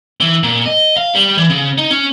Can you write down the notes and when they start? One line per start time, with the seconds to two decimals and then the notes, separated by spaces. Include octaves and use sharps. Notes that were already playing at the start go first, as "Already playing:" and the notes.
0.21 E3
0.43 A#2
0.66 D#5
0.97 F5
1.14 G3
1.38 E3
1.50 C#3
1.78 D#4
1.91 C#4